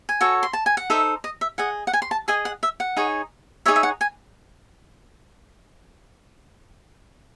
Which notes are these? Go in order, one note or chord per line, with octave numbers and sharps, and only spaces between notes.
G#5
F#4 A4 C#5
C6
A5
G#5
F#5
D#4 A4 C5 E5
D#5
E5
G#4 D#5 F#5
F#5
G#5
C6
A5
G#4 D#5 G#5
F#5
E5
F#5
D#4 G#4 C#5
D#4 G#4 C#5 E5
E5
F#5
G#5